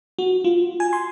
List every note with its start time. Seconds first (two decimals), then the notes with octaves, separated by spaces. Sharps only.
0.19 F#4
0.44 F4
0.80 G#5
0.93 C6